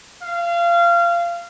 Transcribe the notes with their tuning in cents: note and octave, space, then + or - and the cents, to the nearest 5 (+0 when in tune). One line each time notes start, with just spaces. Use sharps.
F5 -25